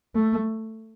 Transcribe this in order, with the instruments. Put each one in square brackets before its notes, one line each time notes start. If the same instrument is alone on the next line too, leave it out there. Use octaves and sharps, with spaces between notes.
[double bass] A3